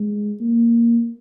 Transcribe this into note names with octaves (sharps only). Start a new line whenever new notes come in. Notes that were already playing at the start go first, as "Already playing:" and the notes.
Already playing: G#3
A#3